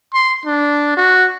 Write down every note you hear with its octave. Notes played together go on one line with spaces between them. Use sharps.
C6
D4
F#4